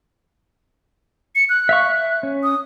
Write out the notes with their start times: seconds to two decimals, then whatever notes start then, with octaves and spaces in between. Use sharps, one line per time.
1.36 C#7
1.49 F#6
1.69 E5 F5 C#6
1.90 E5
2.23 C#4
2.43 D#6